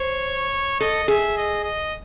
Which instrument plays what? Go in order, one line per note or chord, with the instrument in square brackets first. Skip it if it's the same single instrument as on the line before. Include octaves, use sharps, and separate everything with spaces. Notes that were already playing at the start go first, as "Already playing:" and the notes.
Already playing: [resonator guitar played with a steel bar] C5 [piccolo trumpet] C#5
[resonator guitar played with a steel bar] A4 [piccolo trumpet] D#5
[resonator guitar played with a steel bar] G#4 [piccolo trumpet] E5
[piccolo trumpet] D#5
D#5